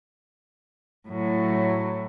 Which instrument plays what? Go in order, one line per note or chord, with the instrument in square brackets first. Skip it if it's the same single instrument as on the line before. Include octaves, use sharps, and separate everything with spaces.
[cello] A2 F#3